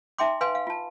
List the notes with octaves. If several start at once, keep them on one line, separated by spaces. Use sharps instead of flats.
D#4 E5 G5 C6 D6
B4 F5 G#5 C6
F5
F4 A5